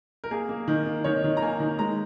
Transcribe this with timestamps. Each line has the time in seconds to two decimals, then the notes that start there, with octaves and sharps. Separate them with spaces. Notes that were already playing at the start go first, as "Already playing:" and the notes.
0.24 A#4
0.31 A#3 G#4
0.49 A#3
0.68 D#3 A#4
0.86 A#3
1.04 D#3 C#5
1.24 D#3
1.37 A#5
1.42 A#3 G#5
1.60 D#3
1.79 G#3 A#5